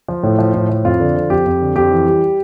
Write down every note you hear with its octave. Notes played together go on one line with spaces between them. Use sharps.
F3
A2
F3
A2
F3
F2 F4
D3
F3
F2 G4
F2
D3
F2 G4
E3
G3